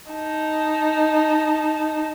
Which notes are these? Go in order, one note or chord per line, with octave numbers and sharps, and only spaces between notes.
D#4 A5